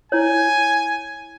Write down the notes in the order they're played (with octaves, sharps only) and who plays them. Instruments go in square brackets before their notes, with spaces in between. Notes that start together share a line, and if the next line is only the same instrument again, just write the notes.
[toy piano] E4 C#5 [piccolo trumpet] G#5